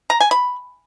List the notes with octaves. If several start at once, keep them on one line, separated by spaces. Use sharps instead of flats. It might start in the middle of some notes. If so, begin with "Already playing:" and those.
A#5
G#5
B5